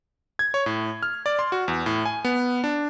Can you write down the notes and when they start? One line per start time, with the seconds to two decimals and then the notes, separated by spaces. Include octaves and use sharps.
0.39 G#6
0.54 C#5
0.66 A2
1.03 F6
1.26 D5
1.39 C6
1.52 F#4
1.68 E2
1.86 A2
2.05 G#5
2.25 B3
2.64 D4